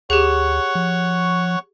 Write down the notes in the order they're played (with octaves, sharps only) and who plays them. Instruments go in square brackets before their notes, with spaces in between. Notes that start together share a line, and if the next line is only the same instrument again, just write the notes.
[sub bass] D2 [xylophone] G4 G#4 [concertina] C#5 F#5 C#6
[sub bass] F3